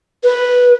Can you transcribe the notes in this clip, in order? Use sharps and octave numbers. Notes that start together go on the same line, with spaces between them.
B4